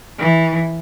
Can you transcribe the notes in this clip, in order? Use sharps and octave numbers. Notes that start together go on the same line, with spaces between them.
E3